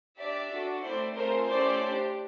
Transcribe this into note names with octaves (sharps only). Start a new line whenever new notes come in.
D4 G4 D5 E5
D4 F#4 A4
A3 C4 E4 C5 D5
A3 C4 F4 G#4 A#4 C5
A3 C#4 E4 G4 C5 D5
D4 G4